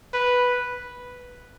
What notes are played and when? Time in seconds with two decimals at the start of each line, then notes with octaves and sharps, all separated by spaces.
0.14 B4